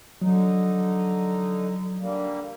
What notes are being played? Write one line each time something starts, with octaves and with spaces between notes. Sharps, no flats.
D3 F#3 D#4
D3 G3 A#3